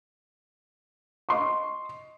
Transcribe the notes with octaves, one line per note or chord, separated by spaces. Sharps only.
D#5 C6 C#6